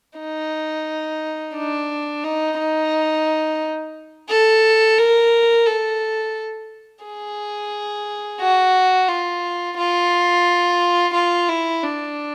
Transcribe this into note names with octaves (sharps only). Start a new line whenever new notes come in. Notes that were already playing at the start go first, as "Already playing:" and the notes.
D#4
D4
D#4
D#4
A4
A#4
A4
G#4
F#4
F4
F4
F4
E4
D4